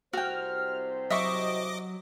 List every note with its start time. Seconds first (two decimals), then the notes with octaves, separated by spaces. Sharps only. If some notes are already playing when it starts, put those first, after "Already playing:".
0.13 C2 C3 F#4 C5 G5 F6
1.10 F#3 D#5 E5 C#6 D6